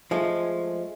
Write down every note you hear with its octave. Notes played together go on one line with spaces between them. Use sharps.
F3 G#3 A3